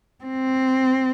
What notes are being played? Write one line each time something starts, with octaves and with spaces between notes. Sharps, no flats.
C4